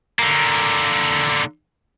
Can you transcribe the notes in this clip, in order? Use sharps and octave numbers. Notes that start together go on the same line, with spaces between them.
D3 A#3